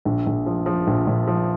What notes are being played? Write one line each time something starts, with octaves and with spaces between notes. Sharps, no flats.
A#1
A#1
F3
F3
A#1
A#1
F3